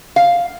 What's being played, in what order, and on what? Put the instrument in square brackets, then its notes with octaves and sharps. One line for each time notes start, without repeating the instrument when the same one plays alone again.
[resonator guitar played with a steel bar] F5